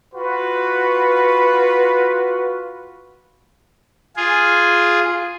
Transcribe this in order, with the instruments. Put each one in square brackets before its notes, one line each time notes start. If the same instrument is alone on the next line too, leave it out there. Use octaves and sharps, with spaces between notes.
[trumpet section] F4 F#4 B4
[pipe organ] F4 G#4